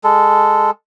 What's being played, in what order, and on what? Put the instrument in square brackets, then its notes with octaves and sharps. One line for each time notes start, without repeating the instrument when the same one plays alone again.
[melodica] G#3 A4